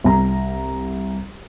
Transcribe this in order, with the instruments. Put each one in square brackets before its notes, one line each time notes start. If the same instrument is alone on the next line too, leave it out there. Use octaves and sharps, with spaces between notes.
[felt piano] C2 A#5